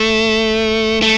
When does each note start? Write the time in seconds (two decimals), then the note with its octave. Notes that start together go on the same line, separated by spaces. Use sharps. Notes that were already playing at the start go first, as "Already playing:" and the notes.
Already playing: A3
1.02 A3